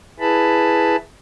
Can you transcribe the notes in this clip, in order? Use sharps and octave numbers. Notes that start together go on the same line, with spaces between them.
E4 G#4 B4 A5 B5